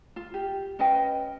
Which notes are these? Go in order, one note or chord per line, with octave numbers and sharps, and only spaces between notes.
F4
G4
C#4 B4 D#5 G5